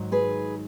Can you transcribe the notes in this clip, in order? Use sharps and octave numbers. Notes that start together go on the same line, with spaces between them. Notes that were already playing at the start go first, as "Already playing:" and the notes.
Already playing: G#2 D#3 F#3
G#4 B4